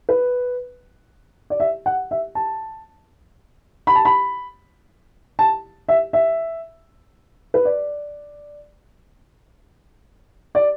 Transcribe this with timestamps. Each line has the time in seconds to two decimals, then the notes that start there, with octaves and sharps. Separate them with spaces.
0.09 B4
1.50 D5
1.60 E5
1.86 F#5
2.11 E5
2.35 A5
3.87 B5
3.95 A5
4.05 B5
5.39 A5
5.89 E5
6.13 E5
7.54 B4
7.65 D5
10.55 D5